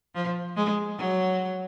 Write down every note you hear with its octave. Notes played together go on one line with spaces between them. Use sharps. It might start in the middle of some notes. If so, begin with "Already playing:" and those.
F3
G#3
F#3